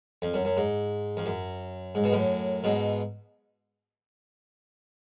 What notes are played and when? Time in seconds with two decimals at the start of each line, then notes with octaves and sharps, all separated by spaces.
0.22 F2
0.34 F#2
0.45 F#2
0.57 G#2
1.17 F2
1.26 F#2
1.95 G#2
2.04 B2
2.12 F#2 A2
2.64 G#2 B2